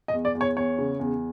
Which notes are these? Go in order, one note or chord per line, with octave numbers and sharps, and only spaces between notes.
D#5
E2
D5
E2
C#5
E2 C#5
C#3
E2